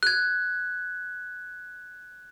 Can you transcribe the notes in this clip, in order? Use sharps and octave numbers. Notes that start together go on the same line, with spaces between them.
F#6 G#6